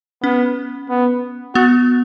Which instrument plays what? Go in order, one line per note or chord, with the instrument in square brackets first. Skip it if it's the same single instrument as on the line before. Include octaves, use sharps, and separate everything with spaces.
[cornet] B3 [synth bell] C#4
[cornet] B3
[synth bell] B3 [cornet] F#4